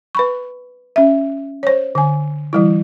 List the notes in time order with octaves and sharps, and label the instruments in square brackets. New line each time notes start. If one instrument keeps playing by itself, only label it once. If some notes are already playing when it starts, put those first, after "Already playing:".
[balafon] B4 B5 C#6
C#4 E5
C5 C#5
D3 G#5
E3 G3 E4